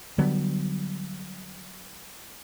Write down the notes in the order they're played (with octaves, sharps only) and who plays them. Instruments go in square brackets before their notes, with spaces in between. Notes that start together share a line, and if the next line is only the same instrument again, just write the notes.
[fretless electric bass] D3 F#3 G3 B3